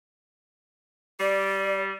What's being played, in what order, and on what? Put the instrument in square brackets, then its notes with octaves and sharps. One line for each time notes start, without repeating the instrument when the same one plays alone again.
[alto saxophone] G3 [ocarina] D5